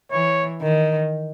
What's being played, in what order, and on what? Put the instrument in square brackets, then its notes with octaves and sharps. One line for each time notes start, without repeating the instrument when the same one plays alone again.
[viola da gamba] E3 [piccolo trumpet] C#5
[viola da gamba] D#3